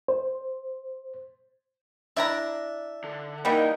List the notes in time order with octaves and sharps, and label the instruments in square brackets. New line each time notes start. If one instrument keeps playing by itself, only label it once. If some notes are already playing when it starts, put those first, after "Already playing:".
[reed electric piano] C5
[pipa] D4 E4 A#5 [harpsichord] E5
[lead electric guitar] D3
[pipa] E3 G3 [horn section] A#3 D#4 [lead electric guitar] F#5 G5